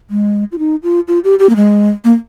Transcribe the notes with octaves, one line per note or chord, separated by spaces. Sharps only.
G#3
F4
D#4
F4
F4
G4
G4
A#3
G#3
A#3